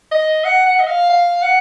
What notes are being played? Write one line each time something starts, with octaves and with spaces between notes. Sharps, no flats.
D#5
F#5
F#5
D#5
F5
F5
F#5